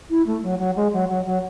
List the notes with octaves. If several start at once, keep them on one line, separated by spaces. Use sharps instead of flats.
E4
A3
F#3
F#3
G#3
F#3
F#3
F#3